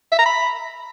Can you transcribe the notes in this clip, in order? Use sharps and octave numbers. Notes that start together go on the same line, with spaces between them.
E5
A#5
B5